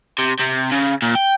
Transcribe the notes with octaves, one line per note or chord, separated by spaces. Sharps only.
C3
C3
C#3
A#2
G5